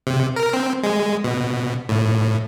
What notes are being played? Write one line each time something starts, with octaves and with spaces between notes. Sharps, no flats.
C3
A#4
C4
G#3
B2
A2